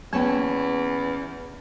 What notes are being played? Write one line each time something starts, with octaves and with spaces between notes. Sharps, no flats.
E2 A#3 B3 C#4 C#5 A5